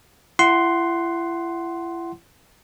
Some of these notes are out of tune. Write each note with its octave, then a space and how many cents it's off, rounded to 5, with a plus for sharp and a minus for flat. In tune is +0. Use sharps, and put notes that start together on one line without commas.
E4 +40 F#5 +15 C6 +0